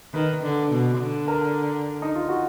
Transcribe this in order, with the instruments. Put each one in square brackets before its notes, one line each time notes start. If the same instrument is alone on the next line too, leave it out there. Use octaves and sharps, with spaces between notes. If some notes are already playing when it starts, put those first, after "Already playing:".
[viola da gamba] D#3 [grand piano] B4
[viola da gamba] D3
B2
D3
[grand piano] A#4
D#4
F4
F#4